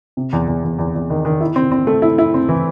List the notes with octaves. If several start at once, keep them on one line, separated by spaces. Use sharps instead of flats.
C3
E2
E2
E2
E2
E2
D#3
D#3
E4
C4
C4
A3
E4
E4
C4
E3